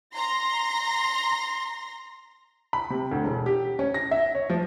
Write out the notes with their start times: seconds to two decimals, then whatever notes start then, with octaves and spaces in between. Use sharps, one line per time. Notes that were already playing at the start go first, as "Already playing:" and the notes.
0.14 A#5 C6 A#6
2.73 B5
2.90 C3
3.11 D2
3.24 E1
3.46 G4
3.79 C#4
3.94 A#6
4.11 E5
4.35 C#5
4.50 F3